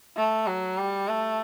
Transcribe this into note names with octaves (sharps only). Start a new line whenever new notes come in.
A3
F#3
G3
A3